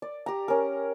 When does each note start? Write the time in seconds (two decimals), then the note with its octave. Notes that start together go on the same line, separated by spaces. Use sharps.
0.02 D5
0.26 G4 A#5
0.48 C#4 A#4